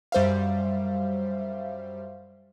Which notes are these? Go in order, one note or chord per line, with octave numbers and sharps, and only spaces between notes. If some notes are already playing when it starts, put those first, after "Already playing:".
F#2 G3 C5 E5 F5